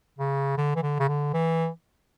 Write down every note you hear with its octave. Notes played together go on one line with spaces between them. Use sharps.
C#3
D3
E3
D3
C#3
D3
E3